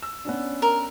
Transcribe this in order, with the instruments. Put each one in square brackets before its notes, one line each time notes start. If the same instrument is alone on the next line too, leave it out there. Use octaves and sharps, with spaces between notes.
[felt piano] E6
B3 C#4 D4
[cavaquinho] A#4